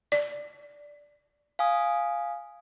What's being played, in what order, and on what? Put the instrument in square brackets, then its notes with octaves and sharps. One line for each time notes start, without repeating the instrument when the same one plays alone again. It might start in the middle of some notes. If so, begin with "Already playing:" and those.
[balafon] D5
[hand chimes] F5 G#5 D#6